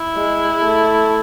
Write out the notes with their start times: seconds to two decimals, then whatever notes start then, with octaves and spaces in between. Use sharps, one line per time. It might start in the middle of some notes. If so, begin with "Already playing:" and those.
Already playing: E4
0.17 G#3
0.62 A3